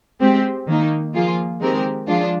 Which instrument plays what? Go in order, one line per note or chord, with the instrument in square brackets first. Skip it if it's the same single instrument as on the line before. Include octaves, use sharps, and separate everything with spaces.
[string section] G#3 C4 G4
D#3 A#3 D#4
F3 A#3 F4 G#4
D#3 G#3 C4 G4 A#4
F3 G#3 D4 F4